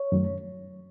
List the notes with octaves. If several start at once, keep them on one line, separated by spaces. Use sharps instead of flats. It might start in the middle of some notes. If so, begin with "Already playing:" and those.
Already playing: C#5
F#2 D#3 F#3 A3